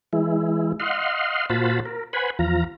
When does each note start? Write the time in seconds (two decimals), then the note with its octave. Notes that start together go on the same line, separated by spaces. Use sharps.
0.13 E3 G#3 E4
0.80 D#5 F5 F#5 C6
1.50 A#2 F4 F#4 C5 A5 B5
1.85 A#4
2.13 B4 C5 F#5 G#5 B5
2.39 E2 F3 F4 A#5